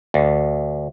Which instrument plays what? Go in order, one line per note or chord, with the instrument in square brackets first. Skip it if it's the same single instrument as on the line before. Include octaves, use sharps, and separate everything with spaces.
[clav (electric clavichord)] D2